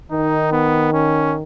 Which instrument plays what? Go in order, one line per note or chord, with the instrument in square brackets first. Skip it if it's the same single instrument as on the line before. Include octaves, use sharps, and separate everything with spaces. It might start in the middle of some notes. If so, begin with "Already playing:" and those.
[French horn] D#3 [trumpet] D#4
[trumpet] B3
C#4